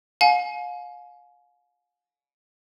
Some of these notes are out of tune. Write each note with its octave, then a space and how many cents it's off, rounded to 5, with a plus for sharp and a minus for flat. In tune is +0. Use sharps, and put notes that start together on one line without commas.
F5 +35 G#5 +30